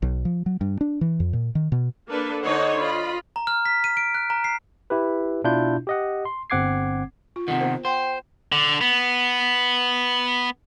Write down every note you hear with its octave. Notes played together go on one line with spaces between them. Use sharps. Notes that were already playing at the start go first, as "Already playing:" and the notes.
B1
F3
F#3
G2
D4
E3
F2
A#2
D#3
B2
A#3 D4 A4 B4
D3 D#4 C5 C#5 D#5 F#5
F4 D#5 B5
A#5
F6
B6
D#7
D7
F#6
A#5
C7
E4 G4 B4
B2 D4 E4 F4 G6
G4 D#5 F#5
C6
G1 C4 F#5 D6 G#6 C7
F4
C3 D#3 F#5
B3 A#4 C5
C5 F#5 G5 C6
D3
B3